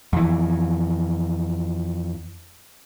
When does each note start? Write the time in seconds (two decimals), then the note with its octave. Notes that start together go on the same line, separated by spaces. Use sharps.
0.13 F2 E3